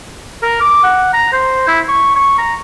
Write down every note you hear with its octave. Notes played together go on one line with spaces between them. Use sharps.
A#4
D6
F#5
A#5
C5
E4
C#6
C#6
A#5